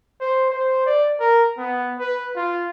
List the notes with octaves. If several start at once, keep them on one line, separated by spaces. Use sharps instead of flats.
C5
C5
D5
A#4
B3
B4
F4